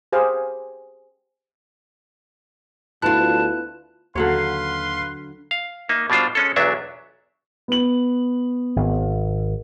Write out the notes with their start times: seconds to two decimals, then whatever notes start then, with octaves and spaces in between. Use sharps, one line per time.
0.12 G4 G#4 C5 F5
3.02 D2 B3 E4 F4 A5 F#6
4.15 D#2 D3 F#3 B4 C#5 F5 C6
5.51 F5
5.89 A#3 D#4 E5
6.10 B2 G3 D4 F4 C5
6.35 G#3 C#4 A4
6.56 B1 E2 F#3 D4 E5
7.68 B3 F#7
8.76 G#1